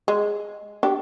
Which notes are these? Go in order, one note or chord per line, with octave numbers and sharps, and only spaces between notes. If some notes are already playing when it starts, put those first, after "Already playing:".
G#3
D4 G4